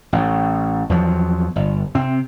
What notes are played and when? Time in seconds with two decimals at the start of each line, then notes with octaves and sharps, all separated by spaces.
0.13 A1 A2
0.89 E2 F3 F#3
1.56 G1
1.95 C3 C4